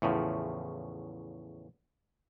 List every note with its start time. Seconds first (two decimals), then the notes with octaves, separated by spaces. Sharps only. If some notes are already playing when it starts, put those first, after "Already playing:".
0.02 E2 A2 C#3 F3